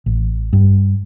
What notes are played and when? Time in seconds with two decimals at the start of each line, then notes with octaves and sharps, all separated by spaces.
0.06 A1
0.53 G2